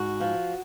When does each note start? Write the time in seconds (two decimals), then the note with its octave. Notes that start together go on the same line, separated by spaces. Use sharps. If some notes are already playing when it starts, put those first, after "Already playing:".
Already playing: G#2 F#4
0.20 F3